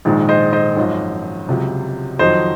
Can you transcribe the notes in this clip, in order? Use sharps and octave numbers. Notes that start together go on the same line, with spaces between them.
A#1 G#2 D#3 G#3
C5 D#5
C5 D#5
G#1 F#2 F3
C#2 C3 F#3
F2 D#3 F#3 C5 D#5